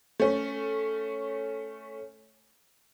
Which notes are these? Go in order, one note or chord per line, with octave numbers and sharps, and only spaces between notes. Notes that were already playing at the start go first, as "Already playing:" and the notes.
A3 C#4